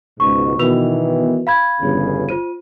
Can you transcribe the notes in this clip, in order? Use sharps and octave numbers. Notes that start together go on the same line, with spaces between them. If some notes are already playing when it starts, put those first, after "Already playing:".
C#2 G#2 B2 C#6
B2 D#3 E3 F#4 B4 F7
F5 B5 G#6
G1 E2 C#3
F4 C5 D#7